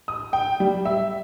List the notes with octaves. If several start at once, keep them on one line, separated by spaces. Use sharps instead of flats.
D#6
G5
G3
E5